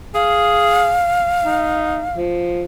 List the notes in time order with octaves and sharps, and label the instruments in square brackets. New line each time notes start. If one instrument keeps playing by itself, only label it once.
[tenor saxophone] G#4 [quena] F5
[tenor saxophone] D#4
F3